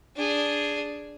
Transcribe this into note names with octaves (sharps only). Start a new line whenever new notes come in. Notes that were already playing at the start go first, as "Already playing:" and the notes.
D4 G#4